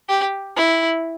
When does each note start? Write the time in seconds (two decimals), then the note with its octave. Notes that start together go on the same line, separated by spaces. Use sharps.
0.09 G4
0.57 E4